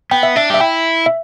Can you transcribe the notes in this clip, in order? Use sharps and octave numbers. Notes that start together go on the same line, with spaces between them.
B3 G5
E5
D4 E5
G4 E5
E4 G5
E5